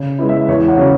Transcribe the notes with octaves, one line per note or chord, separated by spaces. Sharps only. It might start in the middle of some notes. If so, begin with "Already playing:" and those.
Already playing: C#3
G#3 B3 E4
E5
E2 C#5
F#5
C#3 F#3 C#4